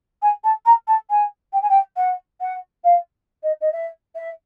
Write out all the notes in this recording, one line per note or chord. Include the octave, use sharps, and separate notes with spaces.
G#5
A5
A#5
A5
G#5
G5
G#5
G5
F#5
F#5
F5
D#5
D#5
E5
E5